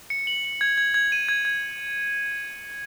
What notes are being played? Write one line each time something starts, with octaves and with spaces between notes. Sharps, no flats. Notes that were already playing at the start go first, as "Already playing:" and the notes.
C#7
F#7
F#7
G#6
G#6
G#6
D#7
G#6
G#6